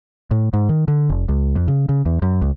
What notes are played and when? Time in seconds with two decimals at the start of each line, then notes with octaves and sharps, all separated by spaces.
0.31 A2
0.53 G#2
0.69 D#3
0.88 D3
1.09 F1
1.29 C#2
1.56 F2
1.68 C#3
1.89 C#3
2.05 E2
2.22 F#2
2.42 C#2